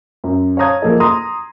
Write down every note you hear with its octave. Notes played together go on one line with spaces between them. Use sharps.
F#2
C#5 F5 A5 A#5 D#6 G#6
F3 A#3 G#4 A4 D#5
A#5 C6 D#6